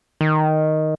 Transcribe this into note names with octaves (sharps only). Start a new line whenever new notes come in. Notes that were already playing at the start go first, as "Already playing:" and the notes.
D#3